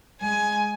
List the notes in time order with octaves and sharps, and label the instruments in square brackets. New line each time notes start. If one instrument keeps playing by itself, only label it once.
[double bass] G#3 [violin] G#5